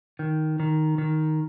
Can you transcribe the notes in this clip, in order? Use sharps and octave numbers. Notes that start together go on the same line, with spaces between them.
D#3
D#3
D#3